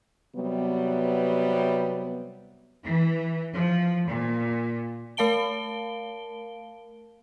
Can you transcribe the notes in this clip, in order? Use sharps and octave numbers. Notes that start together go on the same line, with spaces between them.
C3 F#3 G3 B3
E3
F3
A#2
A3 A#4 F5 A5 D7 G7